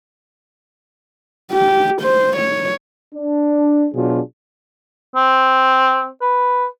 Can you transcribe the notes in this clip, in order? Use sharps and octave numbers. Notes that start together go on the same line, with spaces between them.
G4
C5
C#5
D4
B2 F#3 D4 F4 G#4
C4
B4